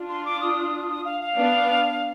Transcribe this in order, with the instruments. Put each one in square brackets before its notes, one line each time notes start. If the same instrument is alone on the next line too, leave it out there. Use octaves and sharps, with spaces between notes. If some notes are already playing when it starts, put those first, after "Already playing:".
Already playing: [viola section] D4 F4
[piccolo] C6
D6
D#6
D#6
F5
F5
[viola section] B3 D4